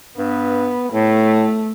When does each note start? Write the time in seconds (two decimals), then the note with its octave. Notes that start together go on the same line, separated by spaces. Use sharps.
0.18 G2 B3
0.93 A2 A3